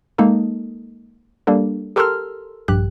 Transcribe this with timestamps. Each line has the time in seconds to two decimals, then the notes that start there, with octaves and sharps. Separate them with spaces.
0.18 G#3 A#3 D#4 A4
1.47 G3 A#3 D4 A4
1.96 G4 A4 A#4 C6 E6 F6
2.68 A#1 G2 G4 F#6